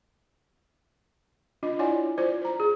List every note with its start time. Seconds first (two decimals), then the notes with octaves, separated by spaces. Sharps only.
1.63 D4 F4 D#5
1.79 E4 F4 C#5 D5 F#5 G#5
2.18 F4 C5 D5
2.41 C5 A#5
2.60 G#4